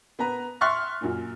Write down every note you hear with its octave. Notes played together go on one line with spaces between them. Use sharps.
B3 B4 A#5
E5 C6 C#6 F6 F#6 A6
F#2 A#2